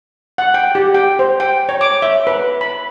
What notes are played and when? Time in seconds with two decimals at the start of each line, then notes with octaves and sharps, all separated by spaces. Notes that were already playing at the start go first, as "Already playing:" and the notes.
0.38 F#5
0.54 G5
0.75 G4
0.94 G5
1.19 C5
1.40 G5
1.69 C#5
1.81 D6
2.02 E5
2.27 B4
2.61 B5